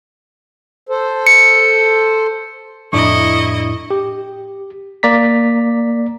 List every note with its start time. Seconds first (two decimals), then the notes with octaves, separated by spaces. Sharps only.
0.89 A4 C5
1.27 C#7
2.93 F2 A2 D4 E4 D#5 A#5 C#6
3.90 G4
5.03 A#3 D5 A#5 B6